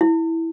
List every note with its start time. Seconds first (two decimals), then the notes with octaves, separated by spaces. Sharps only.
0.01 E4